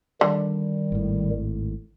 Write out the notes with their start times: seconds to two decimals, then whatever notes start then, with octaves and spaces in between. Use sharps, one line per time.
0.21 D3 D#3 G3
0.92 G#1 A2